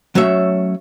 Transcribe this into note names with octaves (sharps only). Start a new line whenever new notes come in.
F#3 A3 C#4 E5